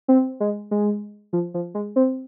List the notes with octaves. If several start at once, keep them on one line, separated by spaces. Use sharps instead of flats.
C4
G#3
G#3
F3
F3
G#3
C4